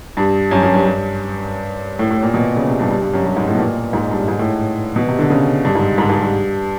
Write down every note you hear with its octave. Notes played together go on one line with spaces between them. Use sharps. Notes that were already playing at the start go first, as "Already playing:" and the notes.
G2
F#2
F#2
G2
G2
A2
A2
A#2
B2
C#3
C3
G2
G2
G2
F#2
G2
G#2
A2
B2
A#2
G#2
G2
G#2
A2
B2
C3
D3
C#3
G2
G#2
G#2
G#2
G2